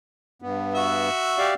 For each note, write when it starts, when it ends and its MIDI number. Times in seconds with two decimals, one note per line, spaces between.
0.42 1.09 43
0.42 1.09 59
0.75 1.53 66
0.75 1.53 76
1.38 1.54 67
1.38 1.54 74
1.38 1.54 77